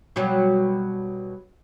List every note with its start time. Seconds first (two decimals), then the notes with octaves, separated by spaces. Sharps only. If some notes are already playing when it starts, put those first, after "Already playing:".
0.16 B2 F#3 G3